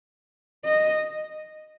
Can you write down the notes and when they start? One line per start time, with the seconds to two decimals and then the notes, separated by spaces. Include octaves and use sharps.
0.65 D#5